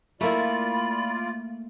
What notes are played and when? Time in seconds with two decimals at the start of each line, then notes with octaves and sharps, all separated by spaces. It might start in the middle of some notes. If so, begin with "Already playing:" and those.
0.21 A3 A#3 E4 F4 D5 B5